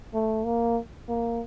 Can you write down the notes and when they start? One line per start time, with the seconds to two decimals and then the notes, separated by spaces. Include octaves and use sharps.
0.14 A3
0.45 A#3
1.09 A#3